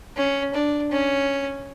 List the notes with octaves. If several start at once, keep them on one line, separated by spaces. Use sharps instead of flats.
C#4
D4
C#4